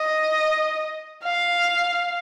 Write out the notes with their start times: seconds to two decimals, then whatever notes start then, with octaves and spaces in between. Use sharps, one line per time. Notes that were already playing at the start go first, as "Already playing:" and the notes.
Already playing: D#5
1.24 F5